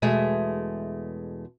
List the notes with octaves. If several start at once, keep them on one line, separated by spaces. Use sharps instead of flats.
E2 B2 G#3 A3